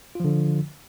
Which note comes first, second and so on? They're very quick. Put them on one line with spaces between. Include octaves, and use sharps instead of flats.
F4 F3 D3